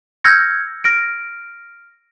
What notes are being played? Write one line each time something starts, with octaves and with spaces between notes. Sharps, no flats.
E6 F6 G6 G#6 A#6 C#7
F6 A#6 D7